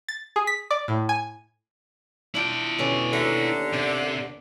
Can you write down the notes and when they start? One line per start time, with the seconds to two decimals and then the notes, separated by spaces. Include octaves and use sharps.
0.08 A6
0.36 G#4
0.47 B6
0.71 D5
0.88 A2
1.09 G#5
2.35 D4 E4 F4 G5
2.79 B2 D3 C#4
3.13 D#2 D3 E5 A#5
3.73 C3 D5